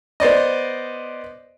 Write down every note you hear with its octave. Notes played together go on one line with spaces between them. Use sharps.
B3 C5 D5 D#5